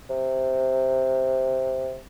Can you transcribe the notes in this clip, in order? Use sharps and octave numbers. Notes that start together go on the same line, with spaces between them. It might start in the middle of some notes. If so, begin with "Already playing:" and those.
C3